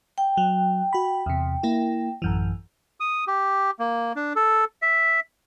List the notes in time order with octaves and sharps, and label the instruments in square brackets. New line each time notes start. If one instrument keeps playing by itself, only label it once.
[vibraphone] G5
[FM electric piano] F#3
F#4 B5
E2 C3
A#3 E4
A1 F#2 E3
[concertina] D#6
G4
A#3
D4
A4
E5